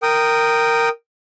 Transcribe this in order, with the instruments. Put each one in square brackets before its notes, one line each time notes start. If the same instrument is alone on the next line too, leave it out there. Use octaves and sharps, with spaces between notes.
[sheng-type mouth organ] A#4 G5 D#6